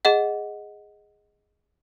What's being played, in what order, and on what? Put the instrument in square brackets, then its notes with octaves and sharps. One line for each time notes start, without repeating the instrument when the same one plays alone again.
[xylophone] G#4 D#5 F#5